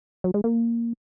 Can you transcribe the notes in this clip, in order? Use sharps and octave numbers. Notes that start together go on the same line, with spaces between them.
F#3
G#3
A#3